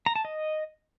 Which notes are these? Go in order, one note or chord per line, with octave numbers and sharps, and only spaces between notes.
A#5
A5
D#5